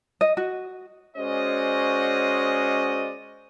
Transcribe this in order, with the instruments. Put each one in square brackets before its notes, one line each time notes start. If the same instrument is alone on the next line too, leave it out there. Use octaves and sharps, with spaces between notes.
[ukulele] D#5
F#4
[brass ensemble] G#3 C#4 F#4 C5 D5 D#5